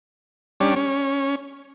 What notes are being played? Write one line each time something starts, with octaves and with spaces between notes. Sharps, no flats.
G3 C#4 D4
C#4